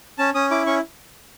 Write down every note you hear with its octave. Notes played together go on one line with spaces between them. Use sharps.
C#4 A5
C#4 D#6
E4 D6
C#4 C#6